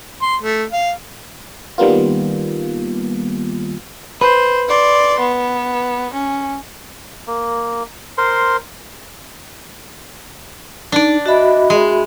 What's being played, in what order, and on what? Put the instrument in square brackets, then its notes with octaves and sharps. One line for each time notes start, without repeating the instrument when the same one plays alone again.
[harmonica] C6
A3
F5
[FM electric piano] D#3 G3 A#3 B3 F4
[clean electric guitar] B4 [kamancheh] C5
[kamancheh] D5 C6
B3
C#4
[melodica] A#3
A#4 C5 C6
[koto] D4 D5 [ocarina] D#4
[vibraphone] F#4 E5 B5 [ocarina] D#5
[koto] G#3